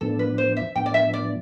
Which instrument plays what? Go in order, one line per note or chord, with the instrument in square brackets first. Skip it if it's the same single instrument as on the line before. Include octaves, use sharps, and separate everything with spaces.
[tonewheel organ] A2 F3 B3 D4 [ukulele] A4
[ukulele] B4
C5
E5
[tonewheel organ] A2 F3 B3 D4 [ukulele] G5
[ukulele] D5
E5
D5